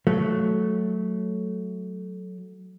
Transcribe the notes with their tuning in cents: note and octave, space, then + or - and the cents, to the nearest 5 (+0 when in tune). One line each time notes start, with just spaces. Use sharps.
F#3 +0 A3 -10